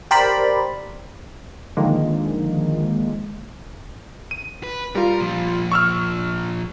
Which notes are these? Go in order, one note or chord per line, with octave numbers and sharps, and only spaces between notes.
G4 A#4 C5 D5 B5
D3 D#3 F3 G#3 A#3
D#7
B4
G3 F4 A#4
A#2 F3
C#6 E6 F6